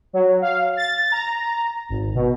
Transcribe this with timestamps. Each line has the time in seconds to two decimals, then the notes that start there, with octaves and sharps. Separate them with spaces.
0.13 F#3
0.42 F5
0.77 A6
1.12 A#5
1.89 G#1
2.15 B2